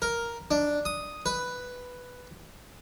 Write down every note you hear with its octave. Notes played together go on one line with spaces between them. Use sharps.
A#4
D4
D#6
B4